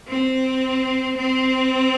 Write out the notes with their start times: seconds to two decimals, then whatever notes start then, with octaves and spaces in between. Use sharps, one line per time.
0.08 C4
1.17 C4